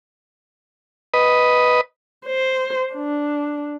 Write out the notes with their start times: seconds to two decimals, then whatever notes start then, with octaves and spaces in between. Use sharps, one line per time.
1.14 B4 D#5
2.26 C5
2.94 D4